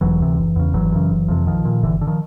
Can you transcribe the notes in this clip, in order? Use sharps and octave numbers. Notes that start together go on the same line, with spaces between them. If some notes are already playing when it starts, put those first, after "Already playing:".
E1 E3 F#3
D2 C3
F#1
E2 C#3
G#1 E3 F#3
F#2 C#3
F#1
F2 C3
A#1 D#3 F3
A#2
G1 D3 E3
D3
D#3 F3